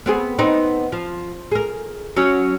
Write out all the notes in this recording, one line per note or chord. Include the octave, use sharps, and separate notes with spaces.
B3 C4 G#4
B3 C4 D#4
F3
G#4 A#4
F#3 C#4